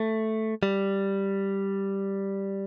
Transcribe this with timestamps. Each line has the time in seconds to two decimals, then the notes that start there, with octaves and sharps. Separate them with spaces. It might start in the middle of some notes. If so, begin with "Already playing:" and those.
Already playing: A3
0.63 G3